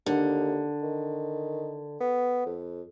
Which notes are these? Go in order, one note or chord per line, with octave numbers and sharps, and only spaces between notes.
D#2 D3
D#3
B3
F2